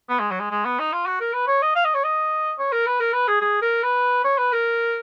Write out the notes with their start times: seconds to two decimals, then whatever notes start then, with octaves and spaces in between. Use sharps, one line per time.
0.09 B3
0.20 G#3
0.31 F#3
0.40 G#3
0.51 G#3
0.65 B3
0.79 D#4
0.93 F4
1.07 F#4
1.21 A#4
1.33 B4
1.47 C#5
1.62 D#5
1.75 F5
1.85 D#5
1.94 C#5
2.04 D#5
2.59 C#5
2.72 A#4
2.87 B4
3.00 A#4
3.13 B4
3.28 G#4
3.41 G#4
3.62 A#4
3.83 B4
4.24 C#5
4.38 B4
4.52 A#4